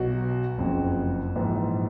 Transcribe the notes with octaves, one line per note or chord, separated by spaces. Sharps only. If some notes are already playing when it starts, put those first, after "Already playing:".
Already playing: B1 B2 F#4
F#1 F2 C#3
A#1 G#2 E3